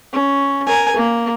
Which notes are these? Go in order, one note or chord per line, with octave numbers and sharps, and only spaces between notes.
C#4
A#4 G#5
A#3